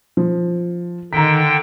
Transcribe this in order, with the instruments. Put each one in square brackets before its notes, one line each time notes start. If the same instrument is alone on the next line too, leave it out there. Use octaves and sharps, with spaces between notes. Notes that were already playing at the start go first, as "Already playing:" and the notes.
[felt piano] F3
[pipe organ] D3 G5 [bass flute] D#3 [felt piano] A#5 B6